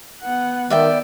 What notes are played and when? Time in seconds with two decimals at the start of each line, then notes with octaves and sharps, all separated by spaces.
0.21 B3 F#5
0.70 D#3 B3 D5 E5 G5